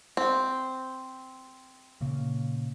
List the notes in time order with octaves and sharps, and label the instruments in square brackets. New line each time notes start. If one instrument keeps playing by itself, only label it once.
[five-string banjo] C4
[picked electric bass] A#2 C#3 A#3